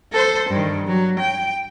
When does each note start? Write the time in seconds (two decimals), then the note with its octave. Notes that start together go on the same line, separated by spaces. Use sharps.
0.12 A4 C5
0.50 G2 D#3
0.87 F#3
1.19 G5